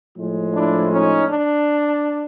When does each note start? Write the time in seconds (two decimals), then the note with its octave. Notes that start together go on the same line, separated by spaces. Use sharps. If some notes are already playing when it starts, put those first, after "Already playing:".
0.16 A2 F3 G#3
0.53 D4 E4
0.91 C#4 D#4
1.27 D4